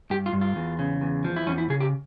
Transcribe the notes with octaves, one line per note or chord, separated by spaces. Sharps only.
G2 G4
F4
G2
F4
E2
C#3
E2
F3
E4
E2 C#4
E4
C#3 G#4
G4